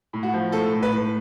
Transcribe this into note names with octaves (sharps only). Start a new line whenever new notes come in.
A2
F#4
F3
A2 A4
A2
B4
A2